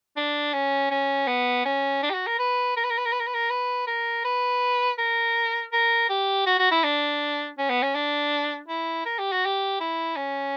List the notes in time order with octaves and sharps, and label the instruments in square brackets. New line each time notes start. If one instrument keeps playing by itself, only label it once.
[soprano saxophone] D4
C#4
C#4
B3
C#4
D4
G4
F#4
A#4
B4
A#4
B4
A#4
B4
A#4
B4
A#4
B4
A#4
B4
A#4
B4
A#4
A#4
G4
F#4
F#4
E4
D4
C#4
B3
C#4
D4
E4
A#4
G4
F#4
G4
E4
C#4